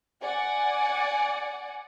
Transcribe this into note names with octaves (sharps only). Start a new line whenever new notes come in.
D5 F#5 G#5